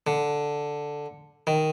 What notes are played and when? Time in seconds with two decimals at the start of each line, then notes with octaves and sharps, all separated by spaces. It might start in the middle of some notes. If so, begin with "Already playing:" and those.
0.07 D3
1.47 D#3